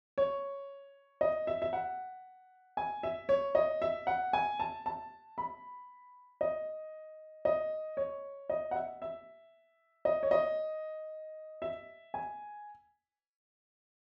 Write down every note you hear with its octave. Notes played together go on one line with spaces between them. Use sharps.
C#5
D#5
E5
E5
F#5
G#5
E5
C#5
D#5
E5
F#5
G#5
A5
A5
B5
D#5
D#5
C#5
D#5
F#5
E5
E5
D#5
C#5
D#5
E5
G#5